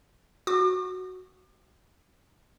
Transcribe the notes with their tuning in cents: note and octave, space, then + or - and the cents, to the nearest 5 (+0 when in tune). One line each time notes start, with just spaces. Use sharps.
F#4 +0 D6 +40